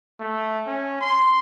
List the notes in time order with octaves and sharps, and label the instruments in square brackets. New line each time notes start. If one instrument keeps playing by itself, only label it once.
[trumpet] A3
C#4
C6